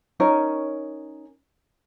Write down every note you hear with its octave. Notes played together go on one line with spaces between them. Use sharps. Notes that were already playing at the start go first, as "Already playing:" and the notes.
C#4 D#4 A#4 C#5